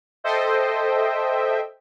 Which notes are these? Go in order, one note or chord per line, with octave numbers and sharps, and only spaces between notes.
A4 C5 D#5 E5 G5